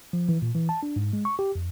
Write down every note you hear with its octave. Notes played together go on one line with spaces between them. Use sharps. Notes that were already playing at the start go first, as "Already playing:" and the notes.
F3
E3
A#2
E3
A5
D4
G#2
G#3
C#6
G4
F2